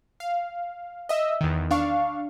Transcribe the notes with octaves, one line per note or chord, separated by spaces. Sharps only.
F5
D#5 E5 E6
E2 D#3
D4 F5 C#6